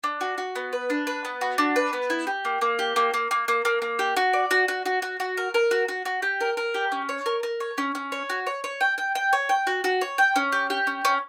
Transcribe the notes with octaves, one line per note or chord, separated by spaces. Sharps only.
D4
F#4
F#4
B3
B4
D4
B4
B3
F#4
D4
B4
B3
E4
G4
A#3
A#3
G4
A#3
A#3
A#3
A#3
A#3
A#3
G4
F#4
D5
F#4
F#4
F#4
F#4
F#4
A#4
A#4
F#4
F#4
F#4
G4
A#4
A#4
G4
C#4
C#5
A#4
A#4
C#5
C#4
C#4
C#5
F#4
C#5
C#5
G5
G5
G5
C#5
G5
F#4
F#4
C#5
G5
C#4
G4
G4
C#4
C#4